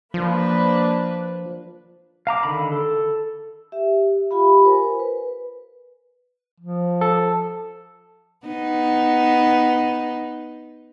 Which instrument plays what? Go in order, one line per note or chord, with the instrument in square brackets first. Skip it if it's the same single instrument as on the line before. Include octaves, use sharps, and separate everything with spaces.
[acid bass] F3 [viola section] A#3 D4 B4
[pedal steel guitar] F5 A#5 D6
D3 D#3 B5
A4
[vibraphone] G4 E5
F4 G4 F5 B5
A#4 C5 G#5
B4
[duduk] F3
[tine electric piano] A4
[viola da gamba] B3 D#4